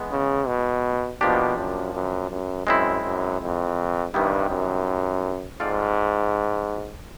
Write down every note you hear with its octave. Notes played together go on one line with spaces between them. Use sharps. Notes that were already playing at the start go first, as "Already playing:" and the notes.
Already playing: E3 G#3 B3
C#3
B2
B2 F3 A#3 D4 G4
F#2
F#2
F#2
F#2 G#3 C4 E4
F#2
F2
G2 C3 D#3 G3 B3 E4
F#2
G#2 C4 F4 A4 D5 F5